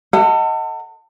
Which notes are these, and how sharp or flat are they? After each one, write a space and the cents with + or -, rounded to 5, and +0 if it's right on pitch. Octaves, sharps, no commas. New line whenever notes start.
A4 +35 D#5 +10 F#5 +0